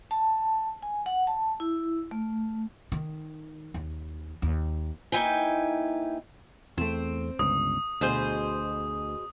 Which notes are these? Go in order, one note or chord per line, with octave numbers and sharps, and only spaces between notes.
A5
G#5
F#5
A5
E4
A3
D#3
D#2
D#2
A#3 D#4 E4 B4 G5 G#5
E2 A3 C4
G1 C#2 D#6
D2 B2 G#4 C5